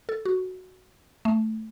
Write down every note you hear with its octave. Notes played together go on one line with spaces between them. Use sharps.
A4
F#4
A3